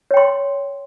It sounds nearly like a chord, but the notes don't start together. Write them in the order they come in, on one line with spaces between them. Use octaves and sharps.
C#5 G5 C6